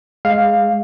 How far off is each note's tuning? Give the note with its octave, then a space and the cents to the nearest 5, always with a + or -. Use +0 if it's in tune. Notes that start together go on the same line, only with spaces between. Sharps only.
G#3 +0 F5 +0